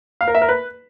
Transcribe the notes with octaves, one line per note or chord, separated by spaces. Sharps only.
F5
A#4
E5
A#4
B4